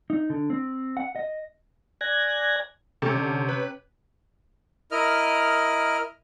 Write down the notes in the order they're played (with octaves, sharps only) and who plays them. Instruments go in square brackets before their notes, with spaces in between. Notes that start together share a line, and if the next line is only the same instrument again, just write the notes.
[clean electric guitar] D#4
D3
C4
F#5
D#5
[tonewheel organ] D5 G#5 F#6 G#6 A#6
[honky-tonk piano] C3 [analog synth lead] C#4 [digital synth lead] A4
[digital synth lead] D3
B4
[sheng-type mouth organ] E4 A#4 D#5 F6